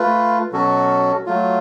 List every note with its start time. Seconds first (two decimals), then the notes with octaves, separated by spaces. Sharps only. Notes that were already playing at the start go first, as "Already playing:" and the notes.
Already playing: A3 F4 B4
0.52 B2 F#3 C#4 F#4 A4
1.26 F#3 A3 F4